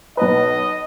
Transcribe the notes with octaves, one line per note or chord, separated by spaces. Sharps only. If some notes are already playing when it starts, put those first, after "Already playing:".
B1 B4 D#5